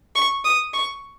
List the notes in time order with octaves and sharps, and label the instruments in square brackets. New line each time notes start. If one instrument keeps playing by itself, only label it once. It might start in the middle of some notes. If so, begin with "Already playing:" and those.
[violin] C#6
D#6
C#6